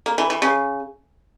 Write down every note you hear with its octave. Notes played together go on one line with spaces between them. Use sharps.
A#3
E3
E3
C#3